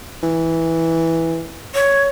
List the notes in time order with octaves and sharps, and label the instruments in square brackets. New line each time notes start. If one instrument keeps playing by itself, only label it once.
[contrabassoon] E3
[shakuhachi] C#5